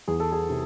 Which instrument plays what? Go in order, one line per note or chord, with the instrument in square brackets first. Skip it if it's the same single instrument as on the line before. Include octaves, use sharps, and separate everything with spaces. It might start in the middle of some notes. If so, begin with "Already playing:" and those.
[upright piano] E2 G#4
A4
G#4
C3